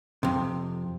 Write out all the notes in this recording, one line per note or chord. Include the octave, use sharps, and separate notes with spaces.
F2 C3